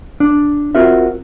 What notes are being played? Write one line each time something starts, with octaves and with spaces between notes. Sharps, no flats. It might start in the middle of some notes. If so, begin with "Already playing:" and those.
D4
C4 F4 F#4 A#4 E5